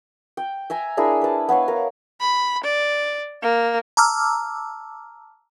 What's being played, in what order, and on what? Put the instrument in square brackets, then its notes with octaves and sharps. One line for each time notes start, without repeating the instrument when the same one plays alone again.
[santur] G5
E5 G#5 A#5
D4 E4 G#4 A#4
B4 A5
B3 B4 C#5 F5
A#4
[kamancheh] B5
D5
A#3
[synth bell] A5 A#5 D6 E6 F6